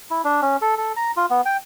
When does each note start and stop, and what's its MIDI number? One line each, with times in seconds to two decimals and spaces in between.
0.11 0.22 64
0.24 0.41 62
0.42 0.57 61
0.62 0.75 69
0.78 0.93 69
0.97 1.11 82
1.17 1.26 65
1.30 1.41 59
1.45 1.57 79